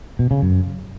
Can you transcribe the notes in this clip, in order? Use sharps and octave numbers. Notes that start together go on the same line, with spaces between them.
B2
C#3
F#2